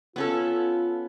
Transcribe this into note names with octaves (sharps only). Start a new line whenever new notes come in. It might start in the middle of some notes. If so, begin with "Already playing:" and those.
B3 C#4 F4 A4